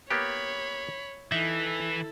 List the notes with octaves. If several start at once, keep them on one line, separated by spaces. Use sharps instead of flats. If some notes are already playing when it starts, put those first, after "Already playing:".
A#3 B3 G4 C#5 B5
E3 D#4 E4 A4 E5